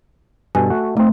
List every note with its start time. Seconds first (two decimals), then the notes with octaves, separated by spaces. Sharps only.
0.55 G2 B2 A4 G#5
0.70 A3 F#4
0.97 A3 C4 D#4